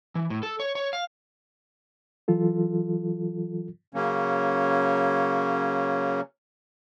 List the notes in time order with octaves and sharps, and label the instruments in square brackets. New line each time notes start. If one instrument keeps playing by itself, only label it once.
[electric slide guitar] E3
A2
A4
C#5
C#5
F5
[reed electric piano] E3 F#3 F4 A4
[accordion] C#3 F#3 A#3 C#4